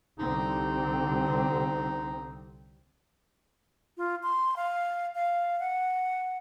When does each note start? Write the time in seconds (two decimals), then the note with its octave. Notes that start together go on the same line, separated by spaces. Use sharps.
0.19 C2 D3 C4 D#4
3.97 F4
4.23 C6
4.56 F5
5.15 F5
5.60 F#5